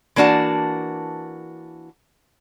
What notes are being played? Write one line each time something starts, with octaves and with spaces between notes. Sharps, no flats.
E3 A#3 D4 F#4 A5